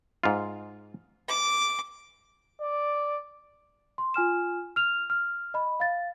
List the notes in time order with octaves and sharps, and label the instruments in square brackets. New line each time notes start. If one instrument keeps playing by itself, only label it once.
[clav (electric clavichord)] G#2 F4
[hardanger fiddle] D6
[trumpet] D5
[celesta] C6
F4 G#5 F6 E7
F6 F7
F6
D#5 B5
F5 A6